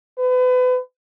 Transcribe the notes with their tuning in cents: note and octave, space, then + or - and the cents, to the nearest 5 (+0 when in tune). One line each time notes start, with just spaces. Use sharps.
B4 +35